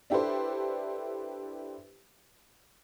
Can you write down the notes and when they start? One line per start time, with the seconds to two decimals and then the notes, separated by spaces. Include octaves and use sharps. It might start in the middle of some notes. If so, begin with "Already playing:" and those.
0.10 D4 E4 G4 A4 B4 C5